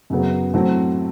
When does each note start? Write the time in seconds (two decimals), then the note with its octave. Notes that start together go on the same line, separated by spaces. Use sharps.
0.10 F#2 C#3 F#3 B3
0.54 A2 F#3 A3 C4